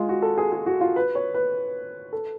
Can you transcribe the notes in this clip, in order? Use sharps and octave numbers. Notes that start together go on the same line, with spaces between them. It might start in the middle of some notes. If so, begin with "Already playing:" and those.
Already playing: G#3 F4
F#4
A4
G#4
G#4
F#4
F4
B4
C#5
B4
A4